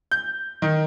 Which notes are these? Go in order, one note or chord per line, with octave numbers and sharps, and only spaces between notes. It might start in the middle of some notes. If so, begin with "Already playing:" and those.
G6
D#3